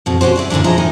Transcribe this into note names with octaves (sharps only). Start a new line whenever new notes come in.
F2 B2
C#4 F#4 G4 C5
E4 G#4 D5
A#2 D3 E3 A#3 D4
F#2 F3 E4 G#4 D#5 A#5
A2 D#3 D#4 G#5